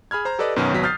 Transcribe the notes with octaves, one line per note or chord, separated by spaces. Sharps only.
G#4 B5 F6 G#6
C5 A#5
G4 A4 B4 D5 D#5
F#2 B2 D#3 F#3 C#4
G#1 C#2 B2 F#3 B6
D#6 F6 G6 A6 C7